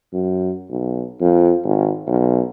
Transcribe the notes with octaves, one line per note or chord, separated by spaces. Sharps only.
F#2
B1
F2
G#1
B1